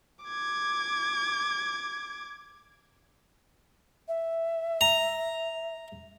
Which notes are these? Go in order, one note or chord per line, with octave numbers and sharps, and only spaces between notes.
D6 G#6
E5
A#5